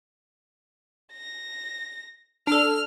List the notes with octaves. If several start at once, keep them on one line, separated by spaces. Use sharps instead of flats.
A#6
D4 A4 F6 F7